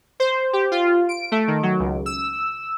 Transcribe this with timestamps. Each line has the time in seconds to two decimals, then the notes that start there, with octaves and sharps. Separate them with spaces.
0.20 C5
0.53 G4
0.72 F4
1.09 D7
1.32 A3
1.48 D#3
1.63 F#3
1.80 C#2
2.06 E6